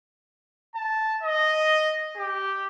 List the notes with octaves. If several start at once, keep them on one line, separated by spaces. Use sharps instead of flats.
A5
D#5
G4